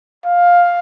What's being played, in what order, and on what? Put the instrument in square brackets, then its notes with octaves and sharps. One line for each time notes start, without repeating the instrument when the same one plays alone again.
[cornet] F5